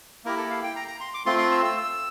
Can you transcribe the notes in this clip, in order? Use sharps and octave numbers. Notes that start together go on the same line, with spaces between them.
A#3 E4 G4 A#4
A4
F5
G5
A#5
A#5
C6
D6
A3 C4 F4 C6
C6
E6
E6
E6